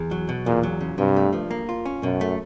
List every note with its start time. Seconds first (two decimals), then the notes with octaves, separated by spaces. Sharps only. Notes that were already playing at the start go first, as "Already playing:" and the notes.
Already playing: E2
0.11 F#3
0.29 B2
0.46 E2 A#2
0.63 F#3
0.80 C#3
0.98 G2 C3
1.16 A3
1.33 F3
1.51 A#3
1.69 F4
1.85 C#4
2.03 F#2 B2
2.21 A3